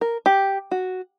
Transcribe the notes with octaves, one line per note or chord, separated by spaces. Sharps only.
A#4
G4
F#4